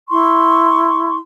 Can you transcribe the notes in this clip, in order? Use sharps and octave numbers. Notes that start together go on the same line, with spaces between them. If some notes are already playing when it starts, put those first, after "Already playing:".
E4 C6 C#6